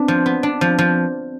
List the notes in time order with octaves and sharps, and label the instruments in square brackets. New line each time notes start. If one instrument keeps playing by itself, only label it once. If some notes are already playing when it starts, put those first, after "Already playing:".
Already playing: [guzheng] B3 D4 [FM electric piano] C4
[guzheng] F3
B3
D4
F3
F3